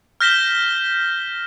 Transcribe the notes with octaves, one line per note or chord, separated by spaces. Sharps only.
F6 G6 A#6 B6 E7 G7